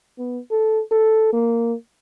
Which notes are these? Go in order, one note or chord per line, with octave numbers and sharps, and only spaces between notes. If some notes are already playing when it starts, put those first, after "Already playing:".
B3
A4
A4
A#3